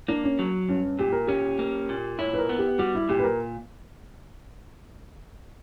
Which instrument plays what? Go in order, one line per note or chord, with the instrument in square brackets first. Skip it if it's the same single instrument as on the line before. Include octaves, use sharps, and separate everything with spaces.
[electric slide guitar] A#3 [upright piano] D4
[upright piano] C#4
[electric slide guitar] F#3
[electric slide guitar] G2 [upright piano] C#4
[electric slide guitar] A#2 [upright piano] G4
[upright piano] A#4
[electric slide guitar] C#4 [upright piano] G4
[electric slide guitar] A#3
A#2
[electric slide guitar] E4 [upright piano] C#5
[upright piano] B4
A#4
[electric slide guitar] B3
[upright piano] G4
[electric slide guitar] G3 [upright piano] F#4
[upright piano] E4
[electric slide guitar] A#2 [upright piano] G4
[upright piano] B4
A#4